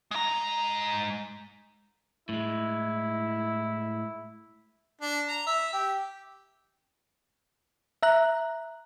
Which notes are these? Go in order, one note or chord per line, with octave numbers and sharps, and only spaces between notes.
G#3 A#5
A2 G#3 E4
D4
A#5
E5
G4
E5 A#5 F#6